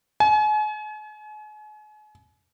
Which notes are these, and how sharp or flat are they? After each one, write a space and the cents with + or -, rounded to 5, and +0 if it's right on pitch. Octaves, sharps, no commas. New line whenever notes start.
G#5 +40